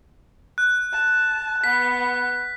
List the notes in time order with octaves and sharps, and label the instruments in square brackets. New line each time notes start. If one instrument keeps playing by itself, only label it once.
[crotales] F#6
[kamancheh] A5
[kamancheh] B3 [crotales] B6